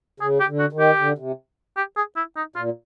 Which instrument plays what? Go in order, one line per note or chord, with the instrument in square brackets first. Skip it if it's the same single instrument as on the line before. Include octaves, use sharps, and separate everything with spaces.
[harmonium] C#3 [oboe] G#4
[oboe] G4
[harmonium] D3
[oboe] F#4
[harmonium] D#3
[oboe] G4
[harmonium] D3
C3
[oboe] G4
G#4
E4
D#4
[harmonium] A#2 [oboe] F4